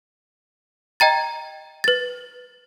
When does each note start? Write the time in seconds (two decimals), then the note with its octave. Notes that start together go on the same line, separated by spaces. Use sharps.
1.00 D#5 G5 A#5 A6
1.84 B4 A6